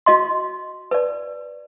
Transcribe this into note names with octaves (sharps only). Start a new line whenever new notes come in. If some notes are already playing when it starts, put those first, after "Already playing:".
F#4 D#5 C6
B4 D5